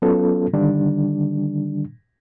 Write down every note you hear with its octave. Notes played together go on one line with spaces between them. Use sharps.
F#3 B3 C#4 F4 A4
D3 D#3 G3 D4